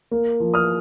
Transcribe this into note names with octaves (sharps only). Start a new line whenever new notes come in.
A#3
F3
D#6 F6